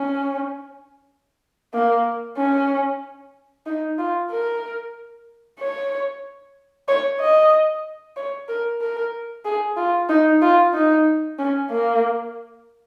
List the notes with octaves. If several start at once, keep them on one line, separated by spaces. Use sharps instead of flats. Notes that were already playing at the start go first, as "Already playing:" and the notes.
Already playing: C#4
A#3
C#4
D#4
F4
A#4
C#5
C#5
D#5
C#5
A#4
A#4
G#4
F4
D#4
F4
D#4
C#4
A#3